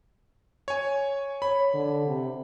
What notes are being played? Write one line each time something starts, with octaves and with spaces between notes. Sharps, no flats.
C#5 G#5
C#5 B5
D3
C3